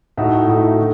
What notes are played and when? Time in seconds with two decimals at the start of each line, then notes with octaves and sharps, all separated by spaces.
0.18 A2 A3 D#4 F#4
0.47 A2 A3 D#4 F#4
0.79 D3